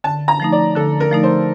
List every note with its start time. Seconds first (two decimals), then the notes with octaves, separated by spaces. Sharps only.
0.04 D3 A5
0.28 A#5
0.40 F3 A3 D#4
0.52 D5
0.75 D3 A4
1.00 A#4
1.11 F3 A3 D#4
1.23 C5